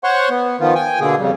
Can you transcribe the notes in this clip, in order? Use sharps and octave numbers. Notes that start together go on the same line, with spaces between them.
C5 C#5 F#5 C6 C#6
B3
D#3 F3 B3 F4
G5 G#5
B2 D3 A#3 G#4
F2 C#3 G3